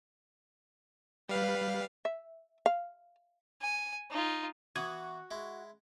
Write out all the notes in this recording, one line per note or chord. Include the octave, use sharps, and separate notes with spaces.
G3 B4 F5
E5
F5
G#5
D#4 F4
E3 B3 F#4 D#6 G#6
G#3 E4